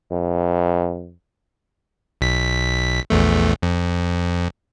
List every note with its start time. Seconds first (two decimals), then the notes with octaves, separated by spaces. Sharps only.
0.12 F2
2.21 B1 B6
3.10 A#1 E2 A3
3.62 F2